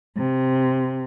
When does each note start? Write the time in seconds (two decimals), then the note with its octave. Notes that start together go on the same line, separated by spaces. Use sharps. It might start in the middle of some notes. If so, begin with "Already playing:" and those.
0.17 C3